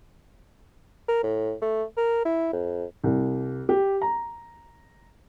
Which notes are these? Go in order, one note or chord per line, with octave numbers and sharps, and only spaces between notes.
A#4
A2
A3
A#4
E4
F2
C2
G4
A#5